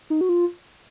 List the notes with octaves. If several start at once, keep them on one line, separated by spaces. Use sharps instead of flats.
D#4
F#4
F4